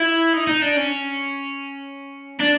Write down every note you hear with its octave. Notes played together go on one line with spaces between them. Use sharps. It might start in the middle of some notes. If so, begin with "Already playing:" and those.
Already playing: E4
D#4
D#4
D4
C#4
D4